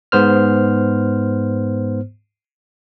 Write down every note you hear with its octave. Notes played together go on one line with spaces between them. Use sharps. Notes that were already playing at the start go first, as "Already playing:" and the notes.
G#2 B3 C5 F6